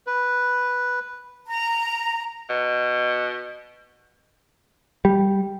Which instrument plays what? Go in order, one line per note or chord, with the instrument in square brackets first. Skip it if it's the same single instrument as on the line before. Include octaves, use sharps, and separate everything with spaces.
[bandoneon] B4
[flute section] A#5
[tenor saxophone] B2
[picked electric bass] G3